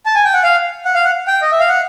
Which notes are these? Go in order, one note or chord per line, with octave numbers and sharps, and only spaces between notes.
A5
G#5
G5
F#5
F5
F#5
F5
F#5
G5
D#5
E5
F5
F#5